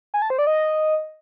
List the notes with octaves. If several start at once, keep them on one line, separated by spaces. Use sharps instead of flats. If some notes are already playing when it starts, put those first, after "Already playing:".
G#5
A5
C5
D5
D#5